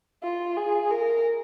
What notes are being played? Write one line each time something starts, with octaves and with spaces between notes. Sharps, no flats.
F4
G#4
A#4